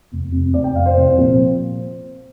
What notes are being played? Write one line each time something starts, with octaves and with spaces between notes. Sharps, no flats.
F1
F2 C3
F1 D5
G5
F2 C3 F5
C5
C2
A#2 F3 C4